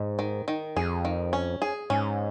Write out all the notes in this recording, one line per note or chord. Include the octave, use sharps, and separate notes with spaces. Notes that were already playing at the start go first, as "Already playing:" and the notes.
Already playing: G#2
D#3
D#3
F2 G#4
D#3
C#4
G#4
G#2 C#4